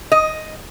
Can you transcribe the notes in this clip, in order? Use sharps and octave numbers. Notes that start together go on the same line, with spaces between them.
D#5